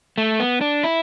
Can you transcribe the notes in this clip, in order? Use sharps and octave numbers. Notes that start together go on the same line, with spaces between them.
A3
B3
D4
E4